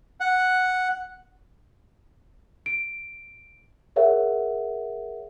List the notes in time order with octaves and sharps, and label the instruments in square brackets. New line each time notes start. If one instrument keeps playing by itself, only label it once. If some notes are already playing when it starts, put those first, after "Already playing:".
[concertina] F#5
[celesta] D7
G#4 A#4 C#5 E5 F#5